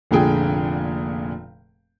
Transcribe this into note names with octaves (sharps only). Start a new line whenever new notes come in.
F1 A#2 D3 G#4 G5